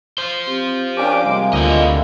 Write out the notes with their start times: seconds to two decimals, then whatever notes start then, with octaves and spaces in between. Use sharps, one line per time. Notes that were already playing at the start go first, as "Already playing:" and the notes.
0.18 F4 C5
0.47 C4 G4
0.97 C#4 D4 G4 A#4 D5 F5 D6
1.24 C3 G3 G#3 A#3 G#5
1.53 D2 E4 F4 A#4 D#5